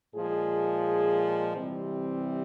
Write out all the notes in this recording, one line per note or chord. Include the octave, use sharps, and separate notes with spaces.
A#2 F3 G#3 G#4
C3 E3 G3 C4